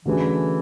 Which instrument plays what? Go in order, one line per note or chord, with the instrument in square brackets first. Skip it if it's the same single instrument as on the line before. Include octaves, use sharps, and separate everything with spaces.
[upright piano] D3 F#3 A3 C#4 G#4 [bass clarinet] E3